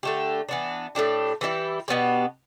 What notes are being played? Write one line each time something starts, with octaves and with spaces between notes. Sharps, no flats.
D3 A3 G4
E3 B3 D4
A2 A3 D4 G4
E3 G3 E4 G4
B2 B3 D4 G4